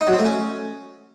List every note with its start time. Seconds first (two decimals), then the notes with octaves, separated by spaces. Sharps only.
0.01 D#4
0.07 F#3
0.13 C4
0.19 A3
0.25 C#4